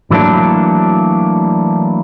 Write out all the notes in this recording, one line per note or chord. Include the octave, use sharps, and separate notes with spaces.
E3 F#3 A3 A#3 D4